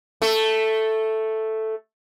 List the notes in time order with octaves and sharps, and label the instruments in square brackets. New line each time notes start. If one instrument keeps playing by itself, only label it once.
[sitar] A3 A4